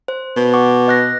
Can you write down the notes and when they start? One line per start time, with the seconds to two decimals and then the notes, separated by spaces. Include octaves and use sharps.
0.08 C5
0.36 B2
0.54 F#5 C#6 D6
0.88 D#5 F#6 A#6